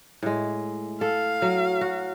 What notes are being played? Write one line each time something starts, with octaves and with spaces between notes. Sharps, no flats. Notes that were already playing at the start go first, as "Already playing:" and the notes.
A2 G#3
A4 F5
F#3
F#4